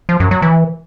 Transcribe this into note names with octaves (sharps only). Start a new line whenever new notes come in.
F3
F#2
F#3
E3